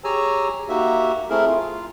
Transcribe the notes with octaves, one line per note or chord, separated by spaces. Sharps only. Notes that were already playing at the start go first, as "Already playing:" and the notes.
G4 G#4 C#5 G#5 A#5 E6
A#3 D#4 F#4 G4 E5
A3 C4 E4 G#4 A#4
F4